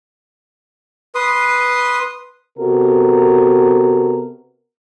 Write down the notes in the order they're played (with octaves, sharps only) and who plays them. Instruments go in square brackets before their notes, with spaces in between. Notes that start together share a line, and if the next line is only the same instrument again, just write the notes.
[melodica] B4 C6 D#6
[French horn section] C3 B3 F#4 A4 A#4